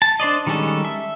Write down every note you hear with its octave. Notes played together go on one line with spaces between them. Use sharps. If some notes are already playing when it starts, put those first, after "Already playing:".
A5
D4 C5 D5 D#5
D#3 G3 G#3 C#4 A4
E5